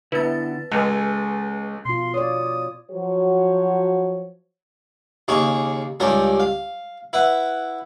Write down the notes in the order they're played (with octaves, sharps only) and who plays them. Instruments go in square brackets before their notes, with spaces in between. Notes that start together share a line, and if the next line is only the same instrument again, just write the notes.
[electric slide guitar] D3 B3 [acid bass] E4 [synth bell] B4 A6
[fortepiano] C#2 [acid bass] G#3 [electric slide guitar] C#4 A4 G#5
[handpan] B2 F4 [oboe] C6
[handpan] C#5 D5 [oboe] D#6
[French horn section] F3 F#3 F#4 C5 C#5
[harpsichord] D#2 C#3 A#3 D#4 G#4 C#6
C#2 G2 C#4 D#4 A#4 G5
F5
E4 B4 F#5